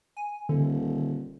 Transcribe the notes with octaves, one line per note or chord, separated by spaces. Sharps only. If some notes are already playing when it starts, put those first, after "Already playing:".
G#5
D#1 D3